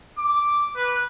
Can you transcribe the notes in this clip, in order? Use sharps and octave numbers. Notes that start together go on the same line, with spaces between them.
D6
B4